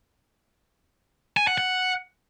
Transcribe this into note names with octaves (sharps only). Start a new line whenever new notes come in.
G#5
F#5
F#5